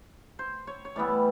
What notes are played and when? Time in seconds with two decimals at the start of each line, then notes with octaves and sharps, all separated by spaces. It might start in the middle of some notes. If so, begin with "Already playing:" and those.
0.39 C5
0.67 C#5
0.85 C#5
0.96 A2 E3 G3 B3 D5